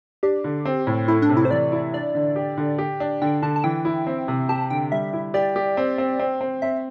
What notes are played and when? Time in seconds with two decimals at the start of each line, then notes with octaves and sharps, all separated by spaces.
0.23 D4 G4
0.44 D3
0.65 C4
0.87 A2
1.08 A3 E4
1.22 D4
1.29 C3
1.37 E4
1.45 C5
1.51 E3 D5
1.72 E4
1.93 D4 D5
2.15 D3
2.36 G4
2.57 D3
2.79 G4
3.00 D4
3.22 D3 G5
3.42 D3 A5
3.56 A5
3.64 E3 G5
3.85 E4
4.07 C4
4.28 C3
4.49 G4 A5
4.70 D3 G5
4.92 G3 E5
5.13 E4
5.34 G4 D5
5.56 G4
5.77 C4
5.98 C4
6.19 C4
6.41 C4
6.62 C4 E5